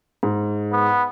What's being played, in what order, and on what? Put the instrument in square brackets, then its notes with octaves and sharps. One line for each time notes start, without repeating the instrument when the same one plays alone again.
[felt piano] G#2
[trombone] B3